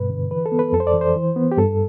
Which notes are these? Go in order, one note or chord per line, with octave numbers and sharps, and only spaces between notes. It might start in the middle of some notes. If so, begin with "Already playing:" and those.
Already playing: G2 B2 B4
D3
E3 B4
A4
B3
B4
F2 A4
C5
D5
E3
C5
E3
B3
G4
G2 A4